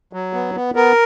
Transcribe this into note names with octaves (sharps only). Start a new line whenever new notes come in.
F#3
B3
B3
B3 A#4